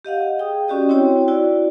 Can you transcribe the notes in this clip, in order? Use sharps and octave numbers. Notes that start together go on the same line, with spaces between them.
G4 D#5 F5 F#5
G#4 G5 D#6
C#4 F#4 G4 D5 D#5
C4 E4 F#4 C#5 G5
E4 F#4 D5